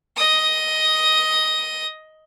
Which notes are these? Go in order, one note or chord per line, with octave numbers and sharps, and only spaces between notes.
D#5 D#6